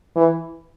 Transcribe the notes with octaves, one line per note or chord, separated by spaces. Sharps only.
E3